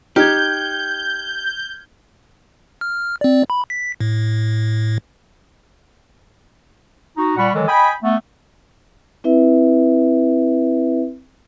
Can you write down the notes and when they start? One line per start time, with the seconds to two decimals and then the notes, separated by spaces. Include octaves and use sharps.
0.16 D#4 G4 F6 G6 G#6
2.81 F6
3.21 C4 D5
3.50 B5
3.70 B6
4.01 A2
7.17 D#4 F#4
7.37 A#2 G3 F#5 B5 C#6
7.55 D#3 E3 F#3 G#3 A4
7.68 D#5 G5 G#5 B5
8.03 A3 B3
9.24 C4 E4 B4 E5